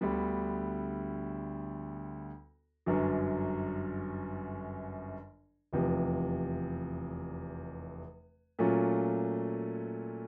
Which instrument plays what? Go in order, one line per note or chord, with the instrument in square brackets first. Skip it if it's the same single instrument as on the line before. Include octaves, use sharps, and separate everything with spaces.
[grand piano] D2 D3 G3 B3
G1 F#2 D3 F#3
F1 E2 C3 F3
A#2 F#3 A3 C#4 F4